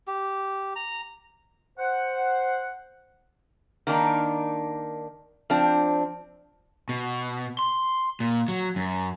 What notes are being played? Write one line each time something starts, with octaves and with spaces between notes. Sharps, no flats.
G4
A#5
C5 F#5
D#3 A#3 D4 D#4
F3 C4 D4
B2
C6
A#2
F#3
F#2